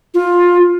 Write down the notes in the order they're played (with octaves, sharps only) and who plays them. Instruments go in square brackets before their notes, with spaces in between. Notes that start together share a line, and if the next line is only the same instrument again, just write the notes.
[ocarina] F4